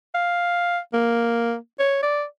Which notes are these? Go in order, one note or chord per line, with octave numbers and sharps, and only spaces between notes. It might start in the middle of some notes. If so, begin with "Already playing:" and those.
F5
A#3
C#5
D5